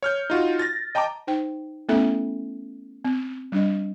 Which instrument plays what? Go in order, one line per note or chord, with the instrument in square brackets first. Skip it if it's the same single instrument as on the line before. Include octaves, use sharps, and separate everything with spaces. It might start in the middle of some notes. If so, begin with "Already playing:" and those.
[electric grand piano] C#5 F6 G6
D#4 F4 F#4
A6 A#6
D#5 G5 A5 A#5 D6
[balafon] D#4 C5 G5
A3 B3 C#4 E4 A4 E5
C4
G3 D4 D#5